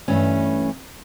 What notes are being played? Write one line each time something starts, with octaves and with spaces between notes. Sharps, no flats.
G2 E3 A3 C#4